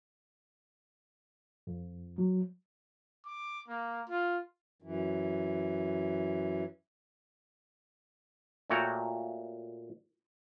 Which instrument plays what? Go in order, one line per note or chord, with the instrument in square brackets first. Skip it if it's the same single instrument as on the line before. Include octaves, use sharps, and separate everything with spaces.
[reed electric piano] F2
F#3
[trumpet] D6
A#3
F4
[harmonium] F#2 E3
[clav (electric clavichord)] A#2 A3 F#4 C#5 G5 A#5